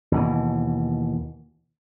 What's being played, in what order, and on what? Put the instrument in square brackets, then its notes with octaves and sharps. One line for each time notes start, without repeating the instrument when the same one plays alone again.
[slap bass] D#2 B2 E3